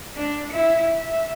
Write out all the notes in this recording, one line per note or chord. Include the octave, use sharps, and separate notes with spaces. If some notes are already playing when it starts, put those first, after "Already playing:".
D4
E4
E5